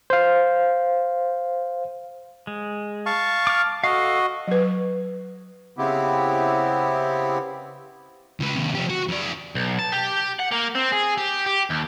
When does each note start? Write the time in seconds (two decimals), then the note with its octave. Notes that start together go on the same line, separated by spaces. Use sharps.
0.10 C5 F5
2.47 G#3
3.06 F5 A5 C#6
3.47 D6 F6
3.84 F#4 A4 D#5 F5
4.47 F#3 B4
5.78 C#3 B3 C4 E4 G4
8.40 C#2 B4
8.55 D#2 C3
8.75 F3 G4
8.90 F#4
9.08 F2 D5
9.55 B1
9.79 A5
9.92 G4
10.40 F#5
10.52 A#3
10.75 C4
10.92 G#4
11.18 G4
11.46 G4
11.70 D#2